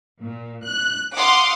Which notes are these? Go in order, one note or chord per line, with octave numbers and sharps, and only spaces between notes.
A#2
F#6
F5 F#5 C6 D6 D#6